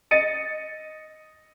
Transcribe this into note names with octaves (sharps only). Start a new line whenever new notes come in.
D#5 A6 C#7 D#7